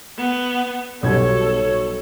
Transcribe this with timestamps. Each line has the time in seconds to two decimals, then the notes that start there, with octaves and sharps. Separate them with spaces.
0.18 B3
1.03 B1 B2 G3 A4 C#5 G#6